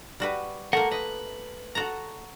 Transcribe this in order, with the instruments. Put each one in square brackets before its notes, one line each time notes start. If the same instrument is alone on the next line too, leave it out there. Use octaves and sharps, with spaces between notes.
[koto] G3 F#4 B4
[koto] A3 A#3 [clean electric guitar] A#4 F#5
[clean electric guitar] B4 [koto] D#5
[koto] F#4 A4 A#5